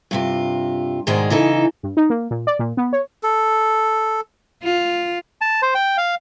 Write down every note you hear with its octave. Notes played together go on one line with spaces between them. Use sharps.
G2 C3 F4
G#2 B2 D#3 G#3 G#4 D5
C#3 E3 D#4 A4
G2
D#4
A#3
A#2
D5
A#2
B3
C#5
A4
F4
A5
C5
G5
F5